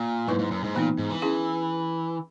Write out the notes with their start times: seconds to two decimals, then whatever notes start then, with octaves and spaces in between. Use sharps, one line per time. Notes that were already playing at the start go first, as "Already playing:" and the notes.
Already playing: A#2
0.28 G#2 F#3 A#3 E4 B4
0.39 G#2
0.51 F#2
0.64 G#2
0.75 A#2 E3 B3 D#4
0.98 G#2
1.11 E3
1.22 C#4 E4 G#4